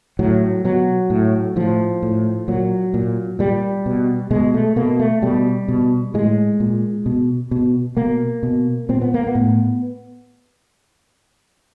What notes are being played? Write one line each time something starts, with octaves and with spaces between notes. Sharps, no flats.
A2 F#3
B2 F#3
A2
A2 F3
A2
A#2 F#3
A#2
A#2 G3
B2
B2 G#3
A3
B2 A#3
A3
B2 G3
B2
A2 G#3
A#2
B2
B2
B2 A#3
B2
A#2 C4
B3
A#3
B3
A2